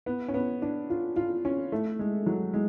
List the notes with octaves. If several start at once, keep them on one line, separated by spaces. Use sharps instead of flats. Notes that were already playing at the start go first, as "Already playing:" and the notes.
B3
C#4
B3
D4
F4
F4
C#4
A3
G#3
F#3
G#3